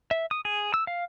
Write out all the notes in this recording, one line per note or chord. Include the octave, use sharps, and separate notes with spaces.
E5
D#6
G#4
E6
F5